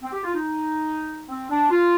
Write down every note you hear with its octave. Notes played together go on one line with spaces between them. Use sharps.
C4
G4
F4
D#4
C4
D4
F4